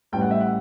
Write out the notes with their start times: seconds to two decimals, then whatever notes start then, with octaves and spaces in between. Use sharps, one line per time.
0.12 A1 A2 G3 G5
0.21 F#5
0.31 E5
0.41 F#5